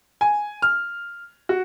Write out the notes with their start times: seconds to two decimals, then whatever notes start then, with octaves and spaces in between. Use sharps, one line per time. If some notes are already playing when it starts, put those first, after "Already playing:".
0.21 G#5
0.62 F6
1.49 F#4